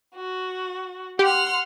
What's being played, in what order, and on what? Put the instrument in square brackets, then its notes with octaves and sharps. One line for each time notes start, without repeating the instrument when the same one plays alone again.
[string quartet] F#4
[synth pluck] G4 [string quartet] F#5 C6 F6